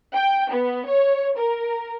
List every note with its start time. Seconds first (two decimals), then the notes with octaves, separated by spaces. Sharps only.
0.14 G5
0.52 B3
0.87 C#5
1.37 A#4